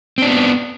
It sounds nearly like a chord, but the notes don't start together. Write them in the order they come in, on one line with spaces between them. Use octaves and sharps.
C4 D4 B3